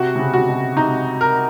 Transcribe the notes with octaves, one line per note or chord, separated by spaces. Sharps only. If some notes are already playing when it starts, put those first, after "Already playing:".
Already playing: C3 F#4
C3
C#3
C3 F#4
B2
C3 D#4
A#4